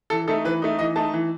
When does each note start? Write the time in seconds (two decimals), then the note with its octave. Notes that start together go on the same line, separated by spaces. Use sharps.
0.10 E3 A4
0.28 A3 D#4 A4
0.44 E3 B4
0.62 A3 D#4
0.79 E3 D#5
0.96 A3 D#4 A5
1.13 E3